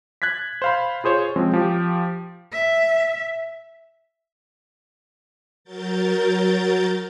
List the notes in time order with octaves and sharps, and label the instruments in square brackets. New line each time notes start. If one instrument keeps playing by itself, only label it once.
[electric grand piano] F#6 G#6 A6 B6
C5 F5 B5
F4 G#4 C5 C#5
F3 G#3 C4 C#4
F3 G4
[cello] E5
[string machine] F#3 A#4 G6 A6